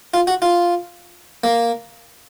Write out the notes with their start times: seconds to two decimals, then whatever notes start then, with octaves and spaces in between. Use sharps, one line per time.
0.14 F4
0.27 F#4
0.42 F4
1.44 A#3